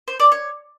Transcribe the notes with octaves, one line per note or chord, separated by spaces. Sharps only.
C5
D5
C#5